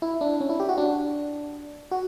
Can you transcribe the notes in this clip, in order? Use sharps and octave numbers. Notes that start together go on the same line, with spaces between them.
E4
D4
C#4
E4
G4
F#4
D4
F#4